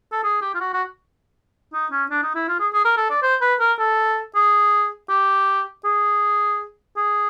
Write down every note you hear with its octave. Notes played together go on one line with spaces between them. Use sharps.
A4
G#4
G4
F4
F#4
F#4
D#4
C#4
D4
D#4
E4
F4
G#4
G#4
A#4
A4
D5
C5
B4
A#4
A4
G#4
G4
G#4
G#4